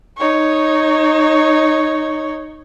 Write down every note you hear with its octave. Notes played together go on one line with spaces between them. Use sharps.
D#4 C#5